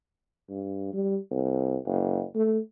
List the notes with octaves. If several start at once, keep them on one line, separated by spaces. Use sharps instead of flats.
G2
G3
C2
F#1
A3